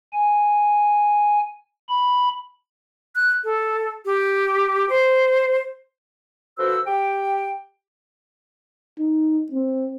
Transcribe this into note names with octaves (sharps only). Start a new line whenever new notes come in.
G#5
B5
F#6
A4
G4
C5
D3 F3 F#4 B4 C5 E6
G4 G5
D#4
C4